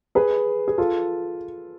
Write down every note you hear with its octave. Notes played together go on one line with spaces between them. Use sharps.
G#4 B4
G#4
F4 A4